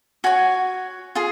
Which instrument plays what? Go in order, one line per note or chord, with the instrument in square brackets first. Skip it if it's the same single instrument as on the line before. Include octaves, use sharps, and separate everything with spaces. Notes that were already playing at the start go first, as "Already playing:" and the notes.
[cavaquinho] F#4 C#5 G#5
F4 G#4